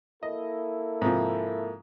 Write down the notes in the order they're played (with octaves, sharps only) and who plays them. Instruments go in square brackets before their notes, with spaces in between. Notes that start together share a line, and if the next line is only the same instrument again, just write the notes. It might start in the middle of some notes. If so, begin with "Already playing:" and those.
[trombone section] A#3 E4 A4 [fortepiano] D#5
[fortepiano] G#2 C3 F3